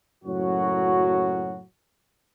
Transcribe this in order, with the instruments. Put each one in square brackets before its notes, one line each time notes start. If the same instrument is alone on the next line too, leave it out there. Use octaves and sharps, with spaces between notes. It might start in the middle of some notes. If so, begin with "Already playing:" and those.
[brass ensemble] F#1 F#2 A2 F#3 F#4